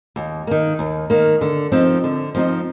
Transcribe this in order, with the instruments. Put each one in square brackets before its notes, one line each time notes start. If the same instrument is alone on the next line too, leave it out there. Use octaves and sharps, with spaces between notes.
[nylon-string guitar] D#2
D#3 A#3
D#2
D#3 A#3
D3
F3 C4 D#4
D3
F3 C4 D#4